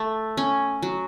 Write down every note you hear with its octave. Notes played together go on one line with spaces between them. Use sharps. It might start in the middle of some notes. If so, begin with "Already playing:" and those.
Already playing: A3
C#4
F#3